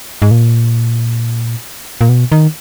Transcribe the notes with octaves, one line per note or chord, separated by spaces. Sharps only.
G#2
A#2
A#2
B2
D#3